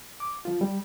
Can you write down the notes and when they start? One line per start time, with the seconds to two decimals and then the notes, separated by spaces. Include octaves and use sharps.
0.20 D6
0.45 F3 F4
0.61 G3